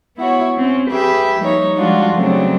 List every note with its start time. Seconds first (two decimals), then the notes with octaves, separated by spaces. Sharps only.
0.18 B3 E4 F#4 C#5
0.58 C4 C#4
0.91 G4 G#4 B4 E5 G5
1.40 F3 G3 A#3 D#4 C#5
1.79 F3 G3 G#3 D4 F4 F#4
2.16 C#3 F#3 G3 A3 C4 D4